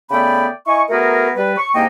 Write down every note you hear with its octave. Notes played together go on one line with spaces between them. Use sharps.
C#3 A3 B3 D5 G5 B5
E4 D#5 G#5 C#6
A3 B3 F#4 G#4 A#4
G3 B4
C#6
C2 G#2 A#3 D#4 D#5 G5